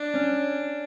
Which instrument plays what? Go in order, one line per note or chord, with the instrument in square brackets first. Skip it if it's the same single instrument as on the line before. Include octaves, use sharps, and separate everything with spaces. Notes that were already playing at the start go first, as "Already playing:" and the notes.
Already playing: [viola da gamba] D4
[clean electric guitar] C#4